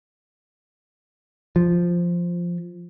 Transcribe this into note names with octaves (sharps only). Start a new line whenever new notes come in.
F3